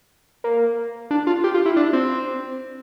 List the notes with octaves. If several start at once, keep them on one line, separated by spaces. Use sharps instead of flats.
A#3
D4
F4
G4
F4
E4
D4
C4